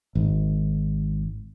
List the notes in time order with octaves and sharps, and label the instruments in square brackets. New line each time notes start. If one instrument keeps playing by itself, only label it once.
[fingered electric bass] G#1